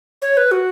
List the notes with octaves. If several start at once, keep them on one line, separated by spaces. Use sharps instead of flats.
C#5
B4
F#4